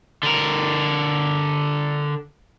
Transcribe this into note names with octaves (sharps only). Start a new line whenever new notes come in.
D3 A#4